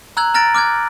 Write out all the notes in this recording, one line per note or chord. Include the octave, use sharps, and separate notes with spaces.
A#5 E6 F#6 G#6 F#7
A#5 F6 A6 A#6 D7
D6 F6 F#6 G#6